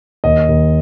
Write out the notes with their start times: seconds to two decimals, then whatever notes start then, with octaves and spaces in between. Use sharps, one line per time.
0.24 D#2 D#5
0.49 D#2